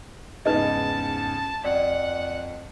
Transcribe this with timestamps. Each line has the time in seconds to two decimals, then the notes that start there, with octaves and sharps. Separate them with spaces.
0.46 E2 G#2 C#3 D#4 B4 D#5 A5
1.64 F2 D5 F#5